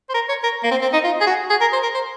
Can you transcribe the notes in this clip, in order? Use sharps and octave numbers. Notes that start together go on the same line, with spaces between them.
C5
A#4
C#5
A#4
A#3
C4
C4
D#4
F4
G#4
F#4
G#4
A#4
C5
A#4
C5